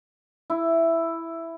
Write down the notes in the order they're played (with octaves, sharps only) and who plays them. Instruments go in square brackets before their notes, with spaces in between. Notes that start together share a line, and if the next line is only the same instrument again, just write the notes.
[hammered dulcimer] E4